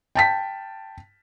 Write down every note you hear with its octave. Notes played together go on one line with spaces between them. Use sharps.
G5 A5 B6